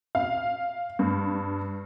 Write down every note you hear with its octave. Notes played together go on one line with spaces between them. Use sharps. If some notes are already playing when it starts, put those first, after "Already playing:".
F5
G2